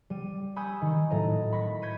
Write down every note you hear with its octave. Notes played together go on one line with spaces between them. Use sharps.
G3 D#7
G#5 B5 C#6 D#6 E6 G6
D#3
A2 F#3 A4 D#5 A#5
B5 C#6 A#6 B6
G6 G#6 A#6 B6 C#7 D#7